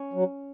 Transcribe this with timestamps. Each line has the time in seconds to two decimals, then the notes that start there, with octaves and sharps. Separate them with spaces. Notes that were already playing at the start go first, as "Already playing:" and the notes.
Already playing: C#4
0.14 F#3